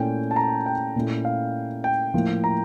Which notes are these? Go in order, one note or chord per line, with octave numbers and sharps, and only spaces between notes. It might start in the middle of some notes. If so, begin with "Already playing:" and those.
Already playing: A#2 A3 C#4 E4 G5
A5
A#5
G5
A#2 A3 C#4 E4
F5
G5
A2 F3 A#3 E4
A#5